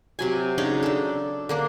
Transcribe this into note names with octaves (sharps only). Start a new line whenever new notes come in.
C3 F#3 G#5
C#3 D4 D#4 C#5
D4 A4
D3 A#3 D4